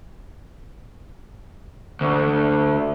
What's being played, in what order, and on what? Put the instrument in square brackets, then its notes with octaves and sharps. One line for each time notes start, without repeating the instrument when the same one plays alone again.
[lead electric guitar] D2